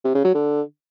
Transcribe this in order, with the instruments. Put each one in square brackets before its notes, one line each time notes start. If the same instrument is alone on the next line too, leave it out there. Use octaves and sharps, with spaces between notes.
[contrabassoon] C3
C#3
F#3
D3